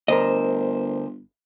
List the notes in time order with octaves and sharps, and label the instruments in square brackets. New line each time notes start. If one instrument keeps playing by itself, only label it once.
[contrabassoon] G1 [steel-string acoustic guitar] D2 C5 [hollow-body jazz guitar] A#4 D#5